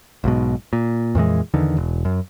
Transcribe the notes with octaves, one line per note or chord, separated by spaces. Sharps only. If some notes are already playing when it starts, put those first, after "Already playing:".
B1 G#2 B2
A#2
F2 A#2 E3 G#3
E2 D3 D#3
E1
F#2